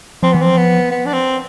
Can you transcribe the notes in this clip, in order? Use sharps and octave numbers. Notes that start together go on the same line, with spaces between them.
F3 C4
E3 B3
F3 C4
B3
B3
D4
C4